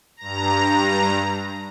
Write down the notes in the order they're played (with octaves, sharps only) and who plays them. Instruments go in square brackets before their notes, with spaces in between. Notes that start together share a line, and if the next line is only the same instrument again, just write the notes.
[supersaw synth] G2 A#5